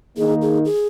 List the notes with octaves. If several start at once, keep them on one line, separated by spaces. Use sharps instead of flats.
D#3 A#3 D#4 G#4
G#4
G#4